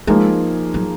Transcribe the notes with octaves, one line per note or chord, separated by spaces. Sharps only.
F3 G#3 A#3 D#4 G#4
F#3